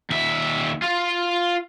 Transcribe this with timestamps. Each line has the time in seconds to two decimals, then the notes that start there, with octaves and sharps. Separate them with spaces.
0.10 D#2 E5
0.82 F4